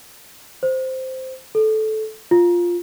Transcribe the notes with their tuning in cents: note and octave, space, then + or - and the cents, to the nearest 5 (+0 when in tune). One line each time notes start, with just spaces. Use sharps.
C5 -5
A4 -15
F4 +0